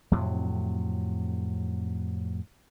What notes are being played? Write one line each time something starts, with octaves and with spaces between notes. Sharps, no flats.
F2 A2 C3 F#3